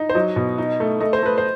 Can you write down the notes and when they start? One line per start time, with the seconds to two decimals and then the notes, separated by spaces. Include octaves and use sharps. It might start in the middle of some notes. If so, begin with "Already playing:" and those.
Already playing: D#4
0.10 C5
0.15 F#3 D#5
0.36 B2
0.58 D#4
0.80 A3
1.01 A3 D#5
1.13 C5
1.23 A3 B4
1.38 C5